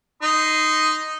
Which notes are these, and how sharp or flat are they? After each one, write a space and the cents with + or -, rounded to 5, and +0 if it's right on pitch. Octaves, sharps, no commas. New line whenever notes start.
D#4 +0 C6 -15 D#6 +0